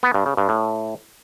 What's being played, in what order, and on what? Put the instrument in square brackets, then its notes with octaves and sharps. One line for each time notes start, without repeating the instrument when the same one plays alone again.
[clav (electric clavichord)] B3
G2
C#3
G2
A2